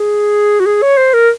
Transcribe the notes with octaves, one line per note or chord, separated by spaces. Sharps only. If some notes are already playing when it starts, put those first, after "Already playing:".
Already playing: G#4
F#4
G#4
C#5
C5
A#4